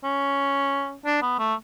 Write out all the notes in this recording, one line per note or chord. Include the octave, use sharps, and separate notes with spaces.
C#4
D4
B3
A3